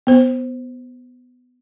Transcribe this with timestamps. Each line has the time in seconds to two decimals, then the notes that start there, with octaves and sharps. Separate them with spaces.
0.07 B3 C5